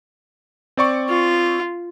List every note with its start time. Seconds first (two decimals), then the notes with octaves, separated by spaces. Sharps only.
0.77 C4 D5 C#6
1.09 F4